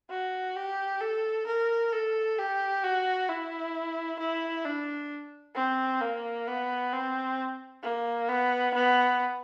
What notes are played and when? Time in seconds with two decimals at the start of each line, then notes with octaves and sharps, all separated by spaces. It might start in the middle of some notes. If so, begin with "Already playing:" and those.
0.10 F#4
0.56 G4
1.01 A4
1.47 A#4
1.93 A4
2.38 G4
2.84 F#4
3.29 E4
4.19 E4
4.65 D4
5.55 C4
6.01 A#3
6.47 B3
6.93 C4
7.82 A#3
8.29 B3
8.74 B3